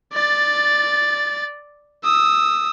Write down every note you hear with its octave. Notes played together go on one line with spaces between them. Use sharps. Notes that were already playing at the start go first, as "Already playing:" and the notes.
D5 A6
D#6 E6